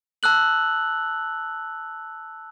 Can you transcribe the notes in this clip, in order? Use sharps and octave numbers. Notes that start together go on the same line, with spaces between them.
A5 E6 F#6 F#7